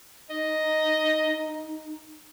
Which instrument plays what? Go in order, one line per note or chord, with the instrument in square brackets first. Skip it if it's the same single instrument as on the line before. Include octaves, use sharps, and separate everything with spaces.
[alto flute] D#4 [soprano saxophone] D#5